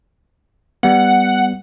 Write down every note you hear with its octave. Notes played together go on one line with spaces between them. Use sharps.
G3 B3 F#5